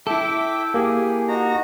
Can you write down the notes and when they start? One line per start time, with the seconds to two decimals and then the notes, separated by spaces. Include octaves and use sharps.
0.07 E4 A4 E5 G5 D6
0.74 A#3 G4 G#4
1.28 D#4 F#4 A#5